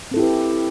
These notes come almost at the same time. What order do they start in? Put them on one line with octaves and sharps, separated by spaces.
C4 A4 E4 G4 B4